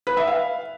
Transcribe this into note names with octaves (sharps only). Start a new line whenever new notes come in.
B4
E5
F5